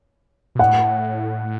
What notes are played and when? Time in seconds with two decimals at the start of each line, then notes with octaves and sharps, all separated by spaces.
0.55 B2
0.59 A2 F#5